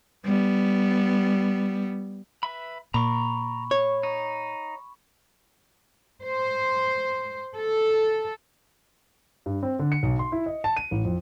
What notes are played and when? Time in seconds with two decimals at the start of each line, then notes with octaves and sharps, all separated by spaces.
0.25 G3 B3
2.43 B4 E5 B5
2.94 A#2 A#5 B5 C#6 D6
3.71 C#5
4.03 D#4
6.22 C5
7.55 A4
9.46 G2
9.63 C4
9.79 D3
9.92 C#7
10.03 B1
10.19 C6
10.32 E4
10.46 D#5
10.64 A5
10.77 D#7
10.91 A1
11.05 F2